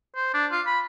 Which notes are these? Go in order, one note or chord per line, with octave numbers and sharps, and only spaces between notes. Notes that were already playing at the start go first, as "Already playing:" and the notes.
C5
D4
F4
B5